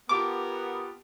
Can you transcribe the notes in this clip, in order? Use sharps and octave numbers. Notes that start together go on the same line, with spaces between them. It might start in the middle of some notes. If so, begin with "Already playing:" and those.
B3 F4 G4 A#4 A5 D6